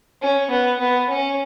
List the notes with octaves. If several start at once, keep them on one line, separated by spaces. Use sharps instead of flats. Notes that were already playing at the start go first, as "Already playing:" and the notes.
C#4
B3
B3
C#4